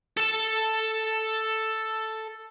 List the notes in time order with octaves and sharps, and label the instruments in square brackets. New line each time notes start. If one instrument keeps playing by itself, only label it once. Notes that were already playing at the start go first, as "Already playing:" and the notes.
[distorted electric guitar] A4 A5